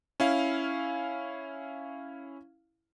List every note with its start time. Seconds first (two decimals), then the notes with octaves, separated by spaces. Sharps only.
0.20 C#4 E4 F5